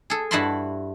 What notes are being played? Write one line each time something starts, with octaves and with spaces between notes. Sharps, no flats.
G#4 A4
G2 E4 F#4 A5 B5 C6